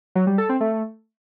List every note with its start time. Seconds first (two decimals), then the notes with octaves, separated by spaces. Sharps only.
0.15 F#3
0.27 G3
0.38 A4
0.49 C4
0.61 A3